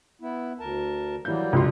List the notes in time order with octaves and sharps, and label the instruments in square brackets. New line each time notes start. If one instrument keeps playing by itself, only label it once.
[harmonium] B3 E4
D2 A#4 A5
[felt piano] E3 G6 [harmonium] F#3 G3 A#3
[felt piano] C#2 F#2 C6 [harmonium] D4 F4